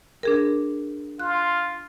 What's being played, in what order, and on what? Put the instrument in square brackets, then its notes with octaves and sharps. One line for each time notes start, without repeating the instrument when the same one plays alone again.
[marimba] D4 G#4 A#4
[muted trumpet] F4 [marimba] F#6